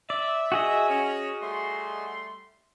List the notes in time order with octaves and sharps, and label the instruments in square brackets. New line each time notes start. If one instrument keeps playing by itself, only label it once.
[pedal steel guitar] D5 [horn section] E5
[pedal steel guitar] F#4 G#4 D#5
[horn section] C#4
G3 A3 C6